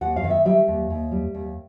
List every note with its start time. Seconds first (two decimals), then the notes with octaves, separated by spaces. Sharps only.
0.01 D#2 F#5
0.16 F5
0.24 D#3
0.30 E5
0.45 G3 E5
0.68 D#2
0.90 D#2
1.12 G3
1.35 D#2